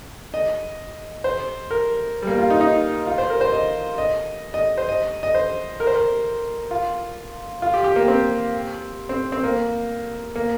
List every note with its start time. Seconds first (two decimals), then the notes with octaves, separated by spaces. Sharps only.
0.34 D#5
1.24 C5
1.71 A#4
2.22 G3
2.27 A#3
2.38 F4
2.50 D#4
2.61 D#4
3.07 F4
3.18 C5
3.30 A#4
3.41 C5
3.52 D#5
3.98 D#5
4.54 D#5
4.77 C5
4.89 D#5
5.23 D#5
5.34 C5
5.80 A#4
5.87 C5
5.95 A#4
6.71 F4
7.62 F4
7.74 G4
7.84 G4
7.96 A#3
8.08 C4
9.09 C4
9.32 C4
9.44 A#3
10.36 A#3